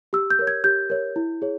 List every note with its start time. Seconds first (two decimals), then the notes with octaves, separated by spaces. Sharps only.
0.13 G4 E6
0.30 G6
0.39 A#4 C#5
0.47 G#6
0.64 G4 G6
0.90 A#4 C#5
1.16 E4
1.42 G#4 C#5